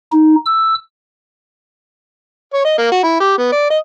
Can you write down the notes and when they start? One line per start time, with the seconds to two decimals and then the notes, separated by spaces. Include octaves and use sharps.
0.12 D#4
0.46 E6
2.53 C#5
2.65 D#5
2.78 A#3
2.91 F#4
3.03 E4
3.20 G4
3.38 B3
3.52 D5
3.70 D#5